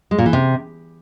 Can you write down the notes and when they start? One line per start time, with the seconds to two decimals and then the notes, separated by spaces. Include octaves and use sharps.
0.11 G#3
0.18 A#2
0.26 E3
0.33 C3